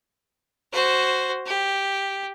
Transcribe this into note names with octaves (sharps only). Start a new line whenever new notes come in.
F#4 C5
G4